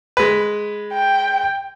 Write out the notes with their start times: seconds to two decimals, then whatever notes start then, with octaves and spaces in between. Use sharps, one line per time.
0.17 G#3 B4
0.94 G5